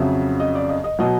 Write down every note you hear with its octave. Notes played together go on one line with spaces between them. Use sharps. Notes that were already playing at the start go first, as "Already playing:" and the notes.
Already playing: F2 C#3 F#3 E5
D#5
D5
D#5
D#5
B2 F#3 D#5